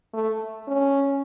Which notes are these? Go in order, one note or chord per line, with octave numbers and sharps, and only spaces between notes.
A3
C#4